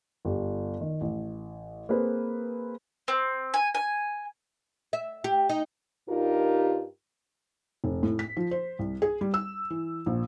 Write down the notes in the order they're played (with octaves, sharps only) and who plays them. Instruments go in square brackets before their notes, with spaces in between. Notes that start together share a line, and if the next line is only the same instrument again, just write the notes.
[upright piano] G1 G4
D#3
A1
A#3 C4 G#4 B4
[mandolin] C4
G#5
G#5
[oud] E5
G4
D#4
[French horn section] G2 D#4 F4 G4 A#4
[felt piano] F1
A2
B6
F3
C5
C2
G#4
G3
E6
E3
A#1